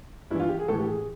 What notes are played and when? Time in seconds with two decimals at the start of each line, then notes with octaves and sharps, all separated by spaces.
0.30 G2 E3 E4
0.40 F4
0.49 G4
0.59 G#4
0.68 A2 E3 A4
0.79 G4
0.87 G#4